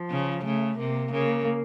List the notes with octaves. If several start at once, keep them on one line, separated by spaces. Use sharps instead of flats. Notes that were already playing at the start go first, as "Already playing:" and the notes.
Already playing: F3
C#3
C#3 A3
C3 A#3
C#3 A#3